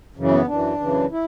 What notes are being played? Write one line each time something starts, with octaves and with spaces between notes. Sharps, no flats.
F#2 C#3 E3
B3
F#2 E3 D4
F#2 C#3 E3
E4